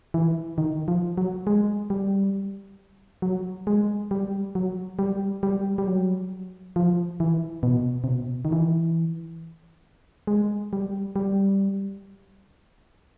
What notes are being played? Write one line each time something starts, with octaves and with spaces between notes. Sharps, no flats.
E3
D#3
F3
F#3
G#3
G3
F#3
G#3
G3
F#3
G3
G3
G3
F#3
F3
E3
B2
C3
B2
D#3
E3
G#3
G3
G3